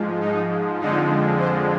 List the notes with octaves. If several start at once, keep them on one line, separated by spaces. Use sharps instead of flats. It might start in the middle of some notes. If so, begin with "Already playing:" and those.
Already playing: G#2 F3 G#3
D#4
F2 D3 F3 G#3 D#4
C5